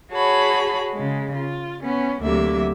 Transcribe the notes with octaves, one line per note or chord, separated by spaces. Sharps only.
F#4 G#4 C#5 A5 B5
C#3 G#3
F4
B3 C#4
D2 C3 F#3 A#3 E5